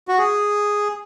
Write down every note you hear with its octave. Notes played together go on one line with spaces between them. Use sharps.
F#4
G#4